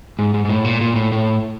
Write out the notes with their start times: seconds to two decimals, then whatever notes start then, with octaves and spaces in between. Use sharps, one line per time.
0.19 G#2
0.34 G#2
0.45 G#2
0.49 A2
0.65 A#2
0.81 A#2
0.96 A2
1.12 A2